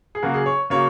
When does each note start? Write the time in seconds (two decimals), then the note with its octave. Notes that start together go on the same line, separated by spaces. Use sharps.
0.15 G#4
0.23 C#3 F#3 A#3 F#4
0.34 G#4
0.46 C#5
0.70 C#3 F#3 A#3 C#5